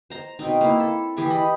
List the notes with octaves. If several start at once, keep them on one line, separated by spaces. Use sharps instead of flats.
C5 A#5
B2 C4 D#4
A#3 E4
A4
E3 G4 G#4 C#6
D#5 B5